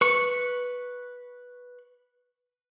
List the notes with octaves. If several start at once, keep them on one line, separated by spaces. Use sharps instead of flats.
B4 C#6